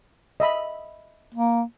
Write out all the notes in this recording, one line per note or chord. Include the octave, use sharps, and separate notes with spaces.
D#5 E5 B5
A#3